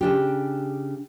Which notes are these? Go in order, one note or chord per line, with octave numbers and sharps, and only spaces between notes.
C#3 D4 G4